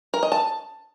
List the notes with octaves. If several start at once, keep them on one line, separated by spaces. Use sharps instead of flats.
A#4
D#5
A5